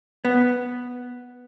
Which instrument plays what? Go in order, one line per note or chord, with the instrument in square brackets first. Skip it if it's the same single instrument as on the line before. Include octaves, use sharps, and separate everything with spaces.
[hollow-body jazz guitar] B3